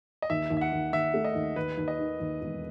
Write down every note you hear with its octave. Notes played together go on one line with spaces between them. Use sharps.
D#5
D#2 E5
D#2
E5
F#5
D#2
D#2 E5
A3
D#5
D#2
D#2 B4
D#2
D#5
D#3
D#2
E1